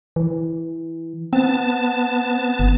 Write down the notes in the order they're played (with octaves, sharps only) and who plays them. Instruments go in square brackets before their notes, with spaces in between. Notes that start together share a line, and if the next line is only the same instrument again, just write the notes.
[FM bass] E3
[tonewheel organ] B3 A5 [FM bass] C4
[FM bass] G1